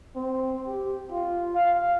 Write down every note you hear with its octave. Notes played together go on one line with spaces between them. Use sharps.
C4
G4
F4
F5